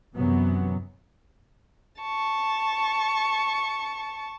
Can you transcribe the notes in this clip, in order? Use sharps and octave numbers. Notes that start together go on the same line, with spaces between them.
F#2 C3 E3 F#3 B3
A5 C#6